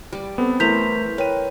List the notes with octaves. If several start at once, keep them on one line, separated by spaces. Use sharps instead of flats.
G3 D5
B3 C4 A4
E3 A3 E4 A#4 C5 G6 B6 F7
A#4 B4 C#5 G5 D#7